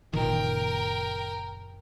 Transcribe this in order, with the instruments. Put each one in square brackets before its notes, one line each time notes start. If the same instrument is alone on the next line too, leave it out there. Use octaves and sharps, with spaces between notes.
[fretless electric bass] F#1 A#2 D#3 [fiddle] A#4 G5